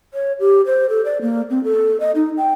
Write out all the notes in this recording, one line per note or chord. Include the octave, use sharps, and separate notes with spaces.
C#5
G4
C5
A4
D5
A#3
C4
A4
D#5
D#4
G5